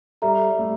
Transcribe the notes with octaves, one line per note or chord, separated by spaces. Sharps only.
G3 A4 E5 A#5
G3
A3